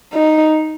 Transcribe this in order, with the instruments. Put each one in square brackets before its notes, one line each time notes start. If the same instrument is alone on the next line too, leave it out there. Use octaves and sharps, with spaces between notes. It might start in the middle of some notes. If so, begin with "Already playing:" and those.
[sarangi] D#4